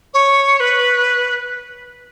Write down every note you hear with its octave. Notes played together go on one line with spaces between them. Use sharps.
C#5
B4